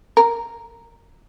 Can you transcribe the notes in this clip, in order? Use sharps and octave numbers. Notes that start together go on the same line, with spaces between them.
A#4